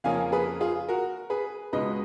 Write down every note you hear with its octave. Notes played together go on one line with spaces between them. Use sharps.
F2 C#3 F3 A#3 C#4 F5 G#5
G#4 B4
F4 G#4
F#4 A#4
G#4 B4
C#2 B2 G#3 B4 D#5